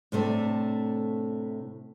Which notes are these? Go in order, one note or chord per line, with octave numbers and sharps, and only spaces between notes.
A2 C3 A3 D4